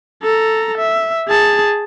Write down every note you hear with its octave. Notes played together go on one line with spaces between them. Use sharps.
A4 A#5
E5
G#4 A5